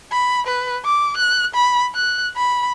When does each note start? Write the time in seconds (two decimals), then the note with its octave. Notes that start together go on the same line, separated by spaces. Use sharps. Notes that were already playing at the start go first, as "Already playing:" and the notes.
0.12 B5
0.47 B4
0.85 D6
1.17 F#6
1.55 B5
1.95 F#6
2.37 B5